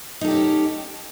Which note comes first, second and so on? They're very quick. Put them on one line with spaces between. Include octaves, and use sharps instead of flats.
D#4 A4 G4 C#4